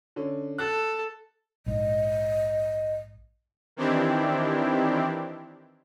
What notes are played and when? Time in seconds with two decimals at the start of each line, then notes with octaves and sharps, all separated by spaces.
0.16 D3 C#4
0.58 A4 F#6
1.66 A#1 G#2 D#5
3.76 D#3 E3 C4 D4 E4 G4